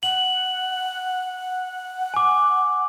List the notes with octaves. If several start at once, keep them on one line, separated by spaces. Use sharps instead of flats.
F#5 F#7
G#5 D6